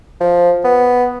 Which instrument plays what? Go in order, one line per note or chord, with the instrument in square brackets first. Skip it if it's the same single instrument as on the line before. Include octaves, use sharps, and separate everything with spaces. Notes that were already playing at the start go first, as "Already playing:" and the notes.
[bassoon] F3
B3